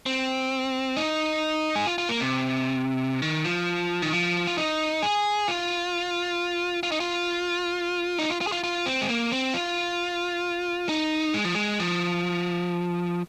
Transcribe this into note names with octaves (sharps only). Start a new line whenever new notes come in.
C4
D#4
G#4
F4
F4
A#3
C3
D#3
F3
D#3
F3
F4
D#4
G#4
F4
F4
D#4
F4
D#4
F4
F4
G#4
F4
F4
C4
G#3
A#3
C4
F4
D#4
G#3
F3
G#3
F3